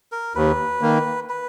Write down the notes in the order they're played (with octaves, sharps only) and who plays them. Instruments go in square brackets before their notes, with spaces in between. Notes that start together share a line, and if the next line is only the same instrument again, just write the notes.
[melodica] A#4
[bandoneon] D#2 [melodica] B4
[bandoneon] D#3 A#3
[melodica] B4